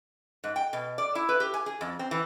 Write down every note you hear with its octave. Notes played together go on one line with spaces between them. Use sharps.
G#2
G5
B2
D5
E4
B4
G4
G#5
G#4
F2
C4
E3